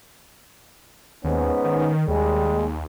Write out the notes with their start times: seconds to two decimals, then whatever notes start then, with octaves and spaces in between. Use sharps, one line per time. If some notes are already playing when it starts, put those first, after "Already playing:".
1.24 D#2 G#2 B3 C#4
1.64 D#3
2.08 D#2 G3 G#3